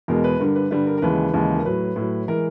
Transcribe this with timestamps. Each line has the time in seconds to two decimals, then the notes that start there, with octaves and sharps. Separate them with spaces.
0.08 E2 B2 G#3 A#4
0.24 B4
0.39 G2 D3 G3 A#4
0.55 B4
0.71 G2 D3 G3 B4
0.87 A#4
0.98 A#4
1.02 D#2 C#3 E3 G#3 B4
1.34 D#2 C#3 E3 G#3
1.57 A#4
1.65 A2 F#3 B4
1.96 A2 F#3
2.28 E3 G#3 A#4